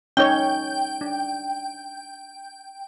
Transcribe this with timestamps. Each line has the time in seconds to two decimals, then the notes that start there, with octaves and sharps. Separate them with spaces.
0.17 C#4 D#4 C#5 G5
1.01 D4